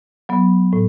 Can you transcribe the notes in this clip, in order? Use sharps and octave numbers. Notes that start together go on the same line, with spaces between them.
F#3 B3
A2